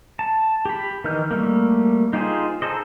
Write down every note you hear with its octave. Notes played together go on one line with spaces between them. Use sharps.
A5
G4 B5
D#3 E3 D#5 F6 G6
G3 A3 A#3
D#4 F4 G4 G#4 C5
D#4 G#4 A4 C5 D#5